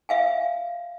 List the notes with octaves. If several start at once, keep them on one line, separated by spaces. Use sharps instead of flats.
E5 F5 G#5